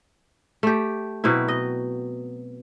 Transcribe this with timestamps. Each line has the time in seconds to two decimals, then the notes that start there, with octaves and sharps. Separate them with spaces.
0.63 A3 G4
1.24 B2 F#3 C4 E4
1.48 D#5